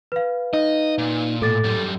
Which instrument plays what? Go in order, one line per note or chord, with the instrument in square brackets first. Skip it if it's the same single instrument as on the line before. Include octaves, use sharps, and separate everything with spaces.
[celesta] B4 F5
[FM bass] D#4 [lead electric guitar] D#5
[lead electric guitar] A#2
[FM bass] A2 [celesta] A4 D6 A6
[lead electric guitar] F#2 G3